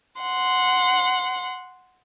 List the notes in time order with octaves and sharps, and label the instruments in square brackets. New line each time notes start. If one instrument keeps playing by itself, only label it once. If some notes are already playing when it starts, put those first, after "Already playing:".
[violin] F#5 C6